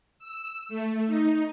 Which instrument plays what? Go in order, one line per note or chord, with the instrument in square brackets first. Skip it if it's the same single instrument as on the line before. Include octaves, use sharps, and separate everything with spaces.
[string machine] E6
A3
D#4